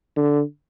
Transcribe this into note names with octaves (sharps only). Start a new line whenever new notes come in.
D3